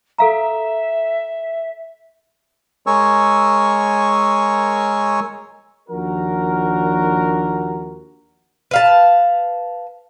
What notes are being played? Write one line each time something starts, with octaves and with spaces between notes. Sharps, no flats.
A4 E5 F5 A#5
G#3 A#4 C#5 G#5 C#6 E6
D#2 F3 D4 F#4 A#4
B4 F5 A5